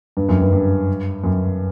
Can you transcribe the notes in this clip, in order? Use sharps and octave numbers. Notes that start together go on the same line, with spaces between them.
G2
F#2
G2
G2
F#2